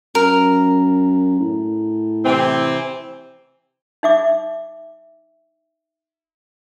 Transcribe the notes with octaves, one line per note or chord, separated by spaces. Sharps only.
F#2 A#4
A2
C3 E3 C4
D#4 E5 D6